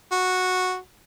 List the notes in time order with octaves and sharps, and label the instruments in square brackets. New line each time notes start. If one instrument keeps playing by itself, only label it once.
[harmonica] F#4